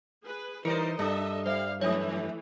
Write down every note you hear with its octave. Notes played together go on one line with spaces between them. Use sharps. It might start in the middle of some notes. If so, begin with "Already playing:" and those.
G#4 B4
E3 G3 D#4 A#4 C5 D#5 C#7
G2 D4 A4 D#5 E5
G3 C5 E5 F5
F2 E3 A3 C#5 D#6